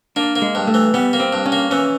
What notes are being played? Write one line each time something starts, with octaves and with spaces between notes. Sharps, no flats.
A#3 D4
A#3
G#3
G2
A3
E3
G3 B3
A#3
C4
G2
C#4
A#3
E3 C#4